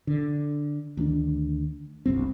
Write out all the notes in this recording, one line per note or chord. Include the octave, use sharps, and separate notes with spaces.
D3
D2 D#3 C#4 D4
F1 C2 G2 C4